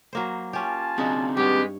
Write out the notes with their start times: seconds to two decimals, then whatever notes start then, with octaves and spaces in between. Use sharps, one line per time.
0.13 F#3 A#3 C5
0.53 C#4 F4 G4 G#5 A5
0.98 C#3 C4 D4 D#4 F#4
1.37 G2 G#3 B3 G4 C#5